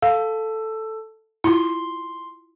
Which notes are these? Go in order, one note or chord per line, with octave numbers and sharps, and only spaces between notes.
A4 F5
E4 F4 C6